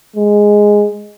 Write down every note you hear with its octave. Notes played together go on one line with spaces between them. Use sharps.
G#3